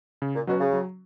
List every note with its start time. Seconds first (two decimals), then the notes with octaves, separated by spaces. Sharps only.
0.22 C#3
0.34 A#2
0.47 B2 F#3 C#4 F#4
0.60 C#3
0.73 F#3